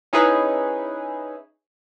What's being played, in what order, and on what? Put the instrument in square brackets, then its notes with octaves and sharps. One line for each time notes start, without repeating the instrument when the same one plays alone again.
[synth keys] C#4 D#4 E4 G#4 B4